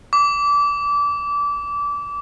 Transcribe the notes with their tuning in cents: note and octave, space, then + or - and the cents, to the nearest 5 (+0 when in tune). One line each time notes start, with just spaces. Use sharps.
D6 -25